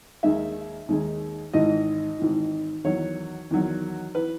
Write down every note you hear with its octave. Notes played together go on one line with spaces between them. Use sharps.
D#2 D#3 G#3 D#4 E5
D#2 D#3 G#3 D#4
G#1 G#2 E3 D#5
G#1 G#2 E3
E2 D#3 F#3 C#5
E2 D#3 F#3
E3 B4